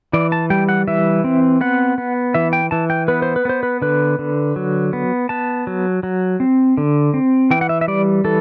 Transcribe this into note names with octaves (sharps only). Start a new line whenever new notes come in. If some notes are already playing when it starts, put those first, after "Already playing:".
E3 D5
A5
G3 G5
F#5
E3 E5
C4
B3 F#5
B3
E3 E5
G5
E3 A5
G5
B3 B4
C5
B4
B3 C5
B4
D3 B4
D3
F#3
B3
B3 A5
F#3
F#3
C4
D3
C4
E3 G5
F#5
E5
E5
G3 D5
E3 A4